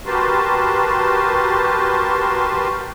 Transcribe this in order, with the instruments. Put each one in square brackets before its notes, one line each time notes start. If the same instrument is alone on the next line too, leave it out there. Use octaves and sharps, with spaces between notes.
[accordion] F#4 G4 A#4 B4 A5 C6